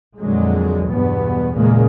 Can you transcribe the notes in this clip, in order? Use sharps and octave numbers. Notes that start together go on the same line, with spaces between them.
F2 A#2 D3 F#3 G#3
E2 G2 B2 B3
E2 A#2 C#3 G#3 A#3